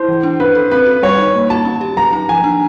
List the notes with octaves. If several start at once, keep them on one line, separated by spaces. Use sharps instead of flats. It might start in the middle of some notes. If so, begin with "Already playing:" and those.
Already playing: E4 C5
E3
D4
C#4 B4
A4
C4 B4
F#4
G3 C#5
D#4
A#3
F#4 A5
C#4
G4
F#3 A#5
D#4
F3 G#5
D4